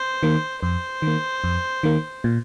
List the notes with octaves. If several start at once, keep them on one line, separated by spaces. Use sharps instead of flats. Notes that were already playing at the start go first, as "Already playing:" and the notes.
Already playing: C5
D#3 A#3
F2 C5
D#3
A#3
F2
D#3 A#3
A#2